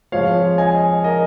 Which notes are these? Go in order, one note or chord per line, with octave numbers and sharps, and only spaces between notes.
F2 F3 G#3 C#5 F5
D#5 G#5
A#4 D#5